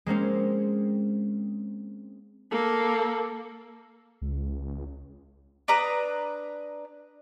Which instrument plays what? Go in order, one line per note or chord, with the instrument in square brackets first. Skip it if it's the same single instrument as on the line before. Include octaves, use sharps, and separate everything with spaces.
[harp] G#3 A#3 C4 C#4
[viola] A#3 A4
[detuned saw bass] C#2
[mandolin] D4 B4 A#5 D#6